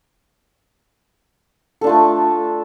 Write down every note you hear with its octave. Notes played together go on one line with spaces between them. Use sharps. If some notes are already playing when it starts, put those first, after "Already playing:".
A3 D4 F4 A4